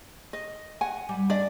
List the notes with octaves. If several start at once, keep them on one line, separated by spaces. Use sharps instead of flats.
D#5
F#5 G#5
G3
D4 D5 D#5